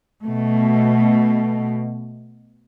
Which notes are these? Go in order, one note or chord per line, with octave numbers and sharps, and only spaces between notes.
B2 A3